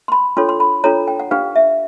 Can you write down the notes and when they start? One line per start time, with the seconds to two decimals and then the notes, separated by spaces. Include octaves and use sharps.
0.08 C6
0.12 B5
0.37 D4 F4 A4 C#5 C6
0.49 C6
0.60 B5
0.84 D4 F4 A4 C#5 A#5
1.08 G5
1.20 F#5
1.31 D4 G4 B4 F5
1.56 E5